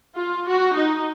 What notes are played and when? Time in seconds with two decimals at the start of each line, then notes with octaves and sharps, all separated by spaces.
0.16 F4
0.46 F#4
0.74 D#4